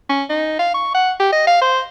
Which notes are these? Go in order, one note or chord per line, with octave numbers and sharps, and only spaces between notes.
C#4
D#4
F5
C#6
F#5
G4
D#5
F5
C5